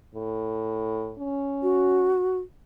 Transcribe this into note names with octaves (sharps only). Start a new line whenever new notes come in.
A2
C#4
F#4